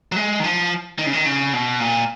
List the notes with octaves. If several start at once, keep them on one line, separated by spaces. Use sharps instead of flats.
F#3
G#3
D#3
F3
D#3
C#3
D#3
C#3
B2
A#2